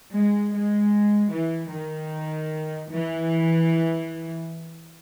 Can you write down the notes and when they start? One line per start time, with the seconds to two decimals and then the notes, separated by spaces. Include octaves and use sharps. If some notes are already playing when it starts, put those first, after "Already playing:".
0.16 G#3
0.56 G#3
1.33 E3
1.73 D#3
2.91 E3